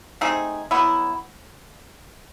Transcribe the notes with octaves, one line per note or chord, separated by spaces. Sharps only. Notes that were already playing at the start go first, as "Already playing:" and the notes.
A3 C4 D#4 G#4
F#3 B3 E4